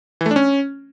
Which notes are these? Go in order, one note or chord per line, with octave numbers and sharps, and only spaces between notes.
E3
A3
D4
C#4